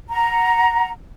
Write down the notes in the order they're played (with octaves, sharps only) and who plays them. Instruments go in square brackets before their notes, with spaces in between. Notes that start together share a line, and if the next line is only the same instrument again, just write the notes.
[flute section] F#5 A#5